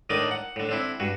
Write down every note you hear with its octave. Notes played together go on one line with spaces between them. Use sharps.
A2 D3 D#3 A#4 D5 D#6
F#5
A2 D3
D3 C4 E4
G2 F#4